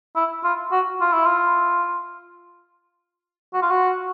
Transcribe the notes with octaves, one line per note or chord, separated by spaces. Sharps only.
E4
F4
F#4
F4
E4
F4
F#4
F4
F#4